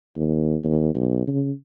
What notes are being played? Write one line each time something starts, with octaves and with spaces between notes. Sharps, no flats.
D#2
D#2
B1
C#3